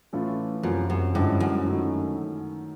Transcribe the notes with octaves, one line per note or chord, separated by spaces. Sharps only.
A2 E3 A3 C#4 F4
F#2 C3 F3 A#3
F#2
G2 D3 F3 G#3 C#4 E4
F#2
D#3 F#3 A3 C#4